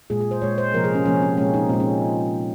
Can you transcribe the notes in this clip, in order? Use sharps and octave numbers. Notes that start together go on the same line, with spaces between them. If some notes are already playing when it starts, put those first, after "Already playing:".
A#2 G#3 G#4
G#4
C5
A#2 G#3 C#5
C5
C3 F3 A#3 A#4
G#4
C#4
C3 F3 A#3 C#4
C4
A#2 G#3 C#4
D#4
A#2 G#3 C4
C#4